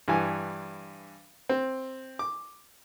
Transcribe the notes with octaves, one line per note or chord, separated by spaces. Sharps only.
G2 E3 G#5
C4
D6